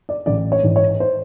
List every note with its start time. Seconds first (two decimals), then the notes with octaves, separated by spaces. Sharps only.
0.09 D5
0.26 A1 D5
0.52 C#5
0.63 G#2 E3
0.76 C#5
1.00 C5